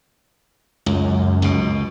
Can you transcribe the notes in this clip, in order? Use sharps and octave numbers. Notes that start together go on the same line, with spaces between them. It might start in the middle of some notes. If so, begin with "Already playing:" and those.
C#2 F#2
C#2 B2